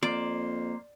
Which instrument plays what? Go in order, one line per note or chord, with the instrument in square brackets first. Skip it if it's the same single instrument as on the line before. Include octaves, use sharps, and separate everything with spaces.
[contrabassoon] F2 [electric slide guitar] A#3 C5 [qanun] D5